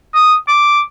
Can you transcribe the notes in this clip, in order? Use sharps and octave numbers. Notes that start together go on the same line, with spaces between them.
D#6
D6